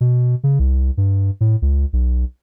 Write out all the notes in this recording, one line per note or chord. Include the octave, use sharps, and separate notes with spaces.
B2
C#3
C2
G2
A2
C#2
B1